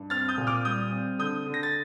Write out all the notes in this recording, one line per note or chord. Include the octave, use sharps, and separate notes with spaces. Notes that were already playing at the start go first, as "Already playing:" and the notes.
Already playing: G2
C4 F6 A6
D#6 G6
A#2
D6 F6
G3 D#6 G6
C4
D3 D#6 G6
D3
A#6
A6